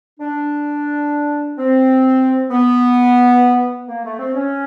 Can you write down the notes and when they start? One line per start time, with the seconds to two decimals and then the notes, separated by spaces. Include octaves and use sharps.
0.20 D4
1.58 C4
2.51 B3
3.88 A#3
4.04 A3
4.19 C4
4.34 C#4